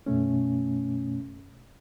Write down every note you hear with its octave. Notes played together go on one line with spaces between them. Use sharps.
F#2 B2 A3 C#4